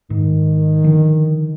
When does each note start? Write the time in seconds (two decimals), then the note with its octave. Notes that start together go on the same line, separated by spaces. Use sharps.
0.10 G#2 D#3
0.84 D3 F3